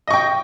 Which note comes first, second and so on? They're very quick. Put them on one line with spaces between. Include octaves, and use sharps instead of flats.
D#5 C#6 G5